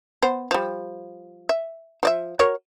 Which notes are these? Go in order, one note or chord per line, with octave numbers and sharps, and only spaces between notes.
B3 C5
F3 G3
E5
F3 D5 E5
F#4 A#4 C#5